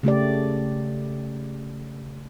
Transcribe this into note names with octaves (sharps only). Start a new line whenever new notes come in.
C#3 A3 G4 D5